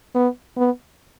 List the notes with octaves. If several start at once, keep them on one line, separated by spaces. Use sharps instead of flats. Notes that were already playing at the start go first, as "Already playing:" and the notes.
B3
B3